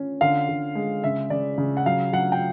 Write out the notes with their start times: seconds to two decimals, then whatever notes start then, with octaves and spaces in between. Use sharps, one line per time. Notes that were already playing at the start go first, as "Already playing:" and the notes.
Already playing: C#4
0.21 D3 F5
0.49 D3
0.75 G#3
1.04 C#3 E5
1.30 C#3 D5
1.58 C#3
1.77 F#5
1.86 F#3 F5
2.12 F#3 F#5
2.32 G5